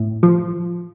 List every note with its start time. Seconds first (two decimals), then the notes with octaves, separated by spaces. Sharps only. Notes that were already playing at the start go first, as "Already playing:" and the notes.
Already playing: A2
0.23 F3